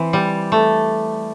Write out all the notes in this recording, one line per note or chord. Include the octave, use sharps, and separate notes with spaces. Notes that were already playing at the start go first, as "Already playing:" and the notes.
Already playing: E3 C4
G3
A3